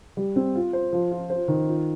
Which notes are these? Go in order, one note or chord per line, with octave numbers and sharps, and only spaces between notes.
G3
C4
F4
C5
F3
F4
C5
D#3
F4